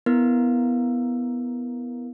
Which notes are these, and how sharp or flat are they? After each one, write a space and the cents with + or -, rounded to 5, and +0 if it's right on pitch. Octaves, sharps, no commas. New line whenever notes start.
B3 +0 E4 +0 A#4 +0